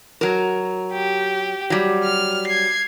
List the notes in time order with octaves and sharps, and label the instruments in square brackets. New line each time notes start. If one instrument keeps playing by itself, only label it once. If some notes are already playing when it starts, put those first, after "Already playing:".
[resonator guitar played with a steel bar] F#3 A#4
[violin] G4
[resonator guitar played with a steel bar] F#3 G3
[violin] F6
G#6 C7